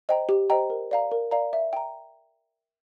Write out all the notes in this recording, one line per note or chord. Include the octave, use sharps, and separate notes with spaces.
C5 D#5 G5 A#5
G4
C5 D#5 G5 A#5
A#4
D5 F5 A#5
A#4
D5 F5 A#5
E5
G5 A#5